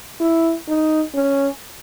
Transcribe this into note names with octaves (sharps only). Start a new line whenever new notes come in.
E4
D#4
C#4